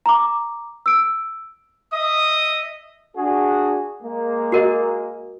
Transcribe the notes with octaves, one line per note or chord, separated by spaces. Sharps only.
A#5 D6
E6 D7
D#5 E5 D#6
D4 F#4 G#4
G#3 A#3
F#4 A#4 D#5